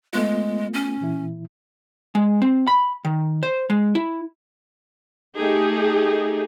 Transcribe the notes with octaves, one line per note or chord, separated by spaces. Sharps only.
G#3 A3 B3 F4
C#4
A#2 E3 E4
G#3
C4
B5
D#3
C5
G#3
E4
A3 D#4 G4 G#4